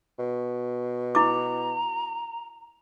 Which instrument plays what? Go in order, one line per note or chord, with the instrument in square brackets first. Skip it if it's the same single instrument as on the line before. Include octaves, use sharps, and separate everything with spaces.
[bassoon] B2
[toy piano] E4 D6 [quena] A#5